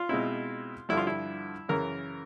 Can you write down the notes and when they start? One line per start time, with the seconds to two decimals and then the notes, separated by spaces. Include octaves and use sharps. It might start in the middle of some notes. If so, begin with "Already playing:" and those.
Already playing: F4
0.09 B2 G#3 C4 E4
0.89 G2 D3 F3 E4
0.97 F4
1.07 E4
1.68 F#2 C#3 E3 A#4